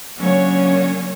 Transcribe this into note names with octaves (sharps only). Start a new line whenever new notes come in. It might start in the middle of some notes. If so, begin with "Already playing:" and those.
C#3 F#3 A#3 C#4 D4 C#5